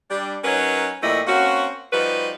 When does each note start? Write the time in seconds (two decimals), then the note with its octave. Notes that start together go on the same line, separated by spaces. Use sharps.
0.11 G3 D4
0.44 F#3 C#4 D#4 A#4 B4 C#5
1.02 A#2 F3 G3 A3 E4 D#5
1.27 A#3 C4 C#4 F#4
1.93 F3 G3 D#4 F#4 B4